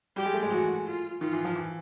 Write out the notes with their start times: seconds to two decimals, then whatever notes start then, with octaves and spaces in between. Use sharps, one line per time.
0.16 G3 G4
0.25 G#3
0.34 A3
0.43 G#3
0.51 E3 F#4
0.87 F4
1.20 D#3 F4
1.33 E3
1.45 F3
1.55 E3